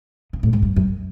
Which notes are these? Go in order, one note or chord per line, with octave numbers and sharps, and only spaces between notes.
C#3
A2
G#2
G2
F#2